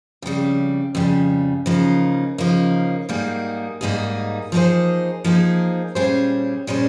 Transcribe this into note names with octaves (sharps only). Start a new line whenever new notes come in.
F2 C#3 G3
F2 C#3 G3
C#3 F3 A#3 D#4
C#3 F3 A#3 D#4
G#2 G3 A#3 D#4 G#4
G#2 G3 A#3 D#4 G#4
F3 A#3 D#4 G#4 C5
F3 A#3 D#4 G#4 C5
A#2 G3 C#4 G#4 C5
A#2 G3 C#4 G#4 C5